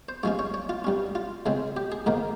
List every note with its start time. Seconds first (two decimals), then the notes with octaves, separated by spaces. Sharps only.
0.09 C5
0.23 G2 F3 G#3 C#4 C#5
0.39 C#5
0.54 C#5
0.69 F4
0.84 G2 G3 C#4
1.15 F4
1.46 C#2 C#3 G#3 C4
1.77 G4
1.92 G#4
2.06 G#2 D#3 A#3 A#4